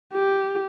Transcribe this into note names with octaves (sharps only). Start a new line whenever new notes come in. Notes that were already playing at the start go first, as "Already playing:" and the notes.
G4